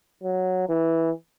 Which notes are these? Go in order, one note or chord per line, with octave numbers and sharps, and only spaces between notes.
F#3
E3